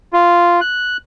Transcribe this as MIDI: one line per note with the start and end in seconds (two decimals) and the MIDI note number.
0.13 0.60 65
0.61 0.97 90